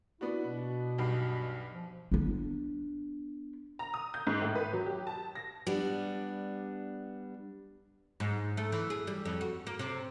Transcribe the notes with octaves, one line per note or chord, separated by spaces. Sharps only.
B3 D4 E4 F#4
B2
B1 G2 C7
F3
B3 D4
A#5
D#6
G6
G#2
A2
B4
F#3
G4
A5
A#6
G3 B3 D4
G#2
A3
E3
G#4
G3
F2
F#4
A#3
C3